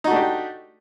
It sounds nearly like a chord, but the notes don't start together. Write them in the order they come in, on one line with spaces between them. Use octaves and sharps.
D#4 F#4 A3 D4 G4